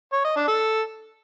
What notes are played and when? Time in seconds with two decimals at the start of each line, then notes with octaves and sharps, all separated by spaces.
0.13 C#5
0.24 D#5
0.36 D4
0.48 A4